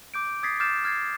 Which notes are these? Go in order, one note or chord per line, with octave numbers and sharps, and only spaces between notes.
D6 G6 D7
D#6 G#6 A6 B6 C7
D6 F6 G6 A6 C7 E7
F6 G#6 A6 C7